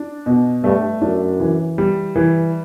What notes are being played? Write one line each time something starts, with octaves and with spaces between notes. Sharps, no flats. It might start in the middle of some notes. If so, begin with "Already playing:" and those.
Already playing: D4
B2
G2 A3
F#2 D4
E3
G3
E3